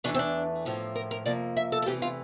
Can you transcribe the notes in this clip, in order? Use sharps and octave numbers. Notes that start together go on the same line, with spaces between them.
E2 E3 A3 D4
C4
D4
A2 F3 A#3
A#4
A#4
F2 C3 F3 A#3 D5
E5
A4
A4
E2 C3 E3 A3 G4
F4